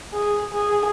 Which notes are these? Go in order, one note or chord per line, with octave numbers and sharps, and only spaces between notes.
G#4
G#4